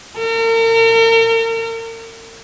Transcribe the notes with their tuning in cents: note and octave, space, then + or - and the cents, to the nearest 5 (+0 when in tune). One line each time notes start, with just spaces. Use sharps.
A#4 -40